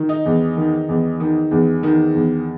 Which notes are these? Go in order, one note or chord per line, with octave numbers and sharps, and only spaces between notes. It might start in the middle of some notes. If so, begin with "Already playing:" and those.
Already playing: D#3
D#4
E2
D#3
E2
D#3
E2
D#3
E2